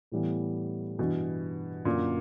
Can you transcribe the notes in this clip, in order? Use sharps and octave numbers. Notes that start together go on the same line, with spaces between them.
A2 E3 G3 B3
G2 B2 E3 G3
F#2 A#2 D3 F#3 A#3